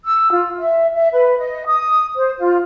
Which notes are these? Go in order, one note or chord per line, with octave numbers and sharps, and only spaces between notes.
E6
F4
E5
E5
B4
D#5
D#6
C5
F4